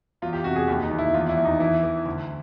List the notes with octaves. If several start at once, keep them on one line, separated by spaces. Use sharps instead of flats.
E2 F4
G4
C3 F#4
G#4
D#2 G4
D#4
D#2
E4
E2 F4
E4
E2
D#4
E3 E4
E3
D2